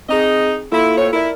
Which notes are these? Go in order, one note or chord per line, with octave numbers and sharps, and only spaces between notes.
C4 D#4 G#4 D#5
A#3 E4 F4 A4
A2 C4 C#5
E4 A#4 D5